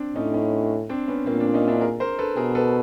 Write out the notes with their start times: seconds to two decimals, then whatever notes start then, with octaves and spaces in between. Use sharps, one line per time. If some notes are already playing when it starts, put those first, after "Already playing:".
Already playing: C4 D4
0.15 A2 C#4 D#4
0.34 C#4 D#4
0.89 C4 D4
1.08 B3 C#4
1.26 A#2 A#3 C4
1.40 C4 D4
1.54 C#4 D#4
1.68 D4 E4
1.81 G#4 A#4
2.00 A#4 C5
2.18 A4 B4
2.37 B2 G#4 A#4
2.55 A4 B4